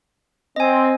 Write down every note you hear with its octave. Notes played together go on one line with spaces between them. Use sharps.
C4 D#5 G#5